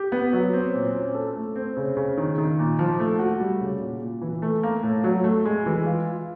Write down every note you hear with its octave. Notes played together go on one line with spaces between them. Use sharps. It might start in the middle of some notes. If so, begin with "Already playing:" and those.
Already playing: G4
B3
F#3
C4
A#2
C#4
A4
A3
C4
C#3
C#3
D#3
D#3
A#2
F3
A3
F#4
G3
C#3
A#2
A#2
E3
A3
A#3
A2
F#3
A3
G#3
E3
F4
F4